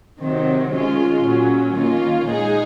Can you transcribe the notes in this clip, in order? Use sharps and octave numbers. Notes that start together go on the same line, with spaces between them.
C3 D#3 F#3 C4
D#3 G#3 C#4 F4
A#2 F#3 C#4
D#3 A#3 C#4 F4
A#2 G#3 D#4 G#4